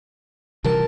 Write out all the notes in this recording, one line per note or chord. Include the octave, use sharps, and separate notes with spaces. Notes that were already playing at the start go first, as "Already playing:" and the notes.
C3 E3 G3 A#4 A5